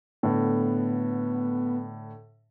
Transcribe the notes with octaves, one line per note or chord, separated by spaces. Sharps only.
A2 D3 B3